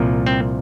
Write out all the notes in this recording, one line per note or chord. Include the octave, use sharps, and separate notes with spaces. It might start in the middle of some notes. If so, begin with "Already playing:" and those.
Already playing: C2 A#2 F3
C4